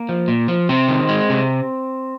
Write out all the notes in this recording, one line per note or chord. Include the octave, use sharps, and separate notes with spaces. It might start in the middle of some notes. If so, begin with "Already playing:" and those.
Already playing: A#3
F3
A#2
F3
C3 C4
D#3
G#3
C3